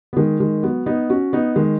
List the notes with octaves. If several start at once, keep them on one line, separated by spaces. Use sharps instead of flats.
B3
D#3 G#3
D#3 G#3
F#3 B3
B3 D#4
C#4 F#4
B3 D#4
D#3 G#3